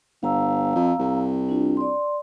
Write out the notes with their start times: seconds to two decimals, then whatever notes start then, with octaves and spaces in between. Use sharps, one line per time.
0.23 G1 F5 A#5 E6
0.75 F2
1.00 C2
1.49 D4 F4
1.77 D5 C6